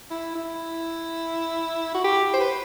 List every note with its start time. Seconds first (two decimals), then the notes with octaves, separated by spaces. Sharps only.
0.10 E4
0.35 E4
1.94 F#4
2.04 G4
2.34 C5
2.40 B4